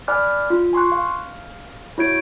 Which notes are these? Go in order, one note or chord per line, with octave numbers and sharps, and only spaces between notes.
D5 G#5 B5 D6 F6 F#6
F4
G#5 C6 C#6 F#6
F5
E4 F#4 C#5 G6 G#6 D7